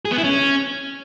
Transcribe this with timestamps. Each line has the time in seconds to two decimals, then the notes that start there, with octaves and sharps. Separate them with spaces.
0.05 G#4
0.12 B3
0.18 E4
0.24 C#4